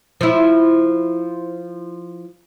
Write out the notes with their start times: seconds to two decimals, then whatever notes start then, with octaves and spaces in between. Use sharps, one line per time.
0.21 F3 E4